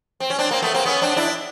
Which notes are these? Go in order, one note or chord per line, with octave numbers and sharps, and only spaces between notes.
C4
C#4
C4 D4
A#3 C4
A3 B3
A#3 C4
B3 C#4
C4 D4
D4 E4